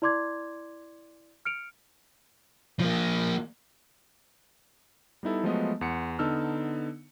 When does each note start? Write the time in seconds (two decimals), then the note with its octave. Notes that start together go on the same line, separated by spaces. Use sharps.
0.02 E4 D5 C6 D6 G#6
1.45 F6 C#7 D7 F7
2.80 F3 A#3
5.23 G3 B3 D#4 E4 A4
5.43 F3 F#3 G#3 A3 B3 D#5
5.81 E2 F#5 C6 C#7
6.19 D3 B3 D#4 A5 E6 F6